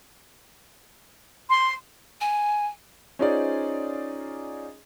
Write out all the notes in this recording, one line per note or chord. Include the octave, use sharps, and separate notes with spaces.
C6
G#5
C#4 D#4 F4 G#4 C5 D5